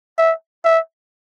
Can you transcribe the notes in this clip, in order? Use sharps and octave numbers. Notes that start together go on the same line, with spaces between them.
E5
E5